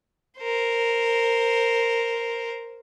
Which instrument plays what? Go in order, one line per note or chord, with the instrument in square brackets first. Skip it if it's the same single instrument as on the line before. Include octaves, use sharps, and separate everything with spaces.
[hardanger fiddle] A#4 C5